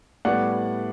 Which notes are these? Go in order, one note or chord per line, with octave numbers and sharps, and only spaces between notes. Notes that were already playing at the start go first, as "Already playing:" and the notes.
A2 G3 B3 D5 F#5